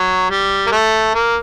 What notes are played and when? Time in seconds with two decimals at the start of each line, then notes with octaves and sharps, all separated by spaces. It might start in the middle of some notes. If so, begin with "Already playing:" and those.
Already playing: F#3
0.30 G3
0.67 A#3
0.72 A3
1.14 A#3